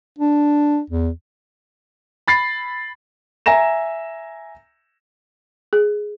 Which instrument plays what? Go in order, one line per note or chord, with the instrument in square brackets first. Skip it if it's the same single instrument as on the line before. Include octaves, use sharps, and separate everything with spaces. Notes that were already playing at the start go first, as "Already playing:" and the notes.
[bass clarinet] D4
E2
[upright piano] B5 A6 C7
[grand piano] E5 G#5 A#5 A#6 E7
[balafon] G#4